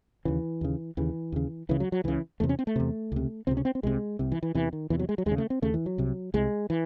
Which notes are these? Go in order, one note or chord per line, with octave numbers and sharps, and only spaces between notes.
D#2 C#3 E3
D#2 C#3
D#2 C#3 E3
D#2 C#3
C#2 C#3 E3
F#3
F#3
C#2 C#3 E3
E2 C3 A3
C#4
C4
A3
E2 C3
C#2 C3
C#2 C3 C4
C#4
C4
C4
C2 C3 G#3
C2 C3
E3
E3
E2 C3 E3
D#3
E2 C3 E3
F#3
G#3
F#3
D#2 G#3
C#3
A3
C4
D#2 C#3 A3
E3
F#3
C2 C3
C2 C3 G#3
E3